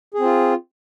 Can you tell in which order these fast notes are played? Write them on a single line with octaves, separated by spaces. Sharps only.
G#4 C4 F4